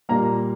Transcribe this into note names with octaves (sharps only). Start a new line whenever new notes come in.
A#2 G3 A#3 A#5